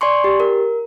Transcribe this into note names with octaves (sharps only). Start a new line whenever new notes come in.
D5 G#5 C6 C#6
G4
A#4